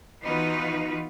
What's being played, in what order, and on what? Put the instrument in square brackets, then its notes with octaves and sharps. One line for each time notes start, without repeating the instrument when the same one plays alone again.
[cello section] E3 B3 D#4 F4 F#4 B4